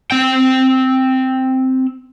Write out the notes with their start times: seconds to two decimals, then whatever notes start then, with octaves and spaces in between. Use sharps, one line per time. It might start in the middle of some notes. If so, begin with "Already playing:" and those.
0.11 C4 G5